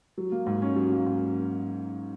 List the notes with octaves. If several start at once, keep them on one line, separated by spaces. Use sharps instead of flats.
F#3
A#3
G#2
C#4
F#3
A#3
G#2